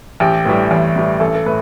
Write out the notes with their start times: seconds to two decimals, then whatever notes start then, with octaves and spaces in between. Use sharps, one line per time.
0.20 A1 G4
0.45 A2 E3 G3
0.71 A1
0.96 A2 E3 G3
1.20 A1 A4
1.35 A4
1.46 A2 B4